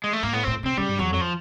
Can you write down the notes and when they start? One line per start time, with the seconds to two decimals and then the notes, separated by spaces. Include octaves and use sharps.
0.04 G#3
0.13 A3
0.23 G#2 A#3
0.33 A2 B3
0.44 A2 C4
0.63 C3 C4
0.77 C#3 G3
0.88 G2
0.99 E2 F#3
1.10 F2
1.14 F#3
1.21 F3